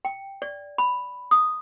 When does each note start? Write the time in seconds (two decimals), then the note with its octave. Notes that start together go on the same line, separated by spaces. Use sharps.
0.05 G5
0.42 D5
0.78 B5
1.31 D#6